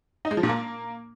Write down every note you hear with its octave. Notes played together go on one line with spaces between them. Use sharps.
D#4
G#3
F3
A#2
A#3